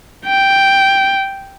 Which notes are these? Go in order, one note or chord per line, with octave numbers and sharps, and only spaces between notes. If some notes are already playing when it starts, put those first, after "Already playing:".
G5